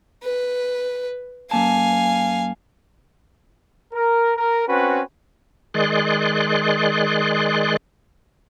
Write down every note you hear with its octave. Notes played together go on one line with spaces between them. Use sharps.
B4
F#2 A#3 F5 G#5 A5
A#4
A#4
C4 C#4 F#4 B4
D#3 G#3 G#4 D5 C6 F#6